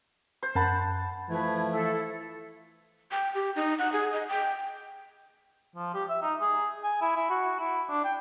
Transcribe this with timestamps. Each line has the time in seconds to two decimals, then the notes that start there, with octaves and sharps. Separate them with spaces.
0.42 C5
0.55 F#2 F#5 A5 B5
1.30 E3 F3 A3 B4 G#6
1.71 E4 A4
3.11 G5
3.35 G4
3.56 D#4
3.79 F#5
3.92 G#4
4.13 D#5
4.29 G5
5.76 F3
5.94 G4
6.09 E5
6.22 D#4
6.41 G#4
6.84 G#5
7.01 E4
7.16 E4
7.30 F#4
7.60 E4
7.89 D4
8.04 G5